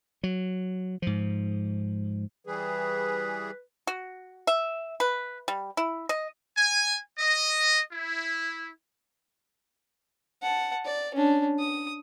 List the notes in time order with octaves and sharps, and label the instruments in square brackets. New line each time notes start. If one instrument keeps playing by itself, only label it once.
[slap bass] F#3
G#2 F3
[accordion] E3 G3 G#4 [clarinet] B4
[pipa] F#4
E5
B4
G3
E4
D#5
[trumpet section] G#5
D#5
E4
[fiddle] F#5 A5
D5
C#4 D4
D#6